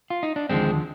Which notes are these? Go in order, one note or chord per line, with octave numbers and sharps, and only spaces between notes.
F4
D#4
D4
D#2 D3 F3 G#3 C4